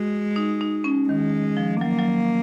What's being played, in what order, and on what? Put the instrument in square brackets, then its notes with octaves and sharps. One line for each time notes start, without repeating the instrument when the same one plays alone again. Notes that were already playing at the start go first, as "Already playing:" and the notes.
Already playing: [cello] G#3 [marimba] F#4
[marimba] D#4
D#4
C#4
[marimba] D#3 [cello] G#3
[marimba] F3
[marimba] F#3 [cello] A#3
[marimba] F#3